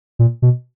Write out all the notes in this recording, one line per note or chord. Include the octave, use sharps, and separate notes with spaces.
A#2
B2